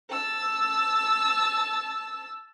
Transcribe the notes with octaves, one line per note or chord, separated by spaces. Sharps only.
A5 E6